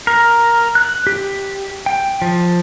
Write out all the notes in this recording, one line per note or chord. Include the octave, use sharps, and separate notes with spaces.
A#4
F#6
G4
G5
F3